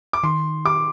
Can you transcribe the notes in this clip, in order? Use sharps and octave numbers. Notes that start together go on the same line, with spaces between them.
D6
D#3 C6
G4 D6